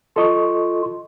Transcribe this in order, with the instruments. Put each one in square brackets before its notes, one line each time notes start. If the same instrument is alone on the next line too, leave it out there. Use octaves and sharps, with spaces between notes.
[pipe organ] F4 [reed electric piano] A4 D#5 C#6